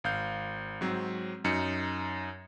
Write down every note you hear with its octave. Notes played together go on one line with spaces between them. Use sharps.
G#1 F5 G6
G#2 F#3 C4
F#2 D#4 C#7